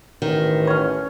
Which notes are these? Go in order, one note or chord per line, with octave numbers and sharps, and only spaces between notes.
A1 D#3
C#4 C#5